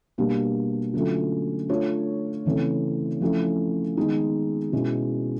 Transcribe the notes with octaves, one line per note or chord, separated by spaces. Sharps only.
B2 G3 A#3 D4 G4
D3 F#3 A3 C#4 F4
A3 D4 F4 A4 C#5
C#3 E3 A3 C4
F3 A3 C#4 E4
D#3 G#3 B3 D#4
B2 G#3 C#4 E4